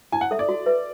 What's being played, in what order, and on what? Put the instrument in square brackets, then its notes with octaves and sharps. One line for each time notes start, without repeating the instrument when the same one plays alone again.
[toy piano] E4 [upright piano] G#5
[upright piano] F#5
[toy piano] A4 E5
[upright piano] D5
[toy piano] F#4
B4 E5